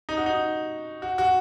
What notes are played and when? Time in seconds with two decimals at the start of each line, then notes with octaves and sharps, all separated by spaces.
0.09 D#4
0.17 F#4
0.26 D#4
1.02 F#4
1.18 F#4